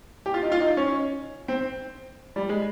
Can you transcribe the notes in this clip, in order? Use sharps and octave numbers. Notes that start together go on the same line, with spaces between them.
G4
F4
D#4
F4
D#4
C#4
C4
G3
G#3